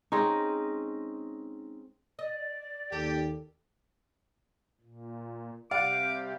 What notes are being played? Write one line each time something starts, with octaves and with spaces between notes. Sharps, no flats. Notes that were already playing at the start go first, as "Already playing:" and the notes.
G#3 C4 C#4 D#4
D5 D#5
D#2 G4 A4 G5
A#2
C3 G3 G4 D5 F5 F#5 D6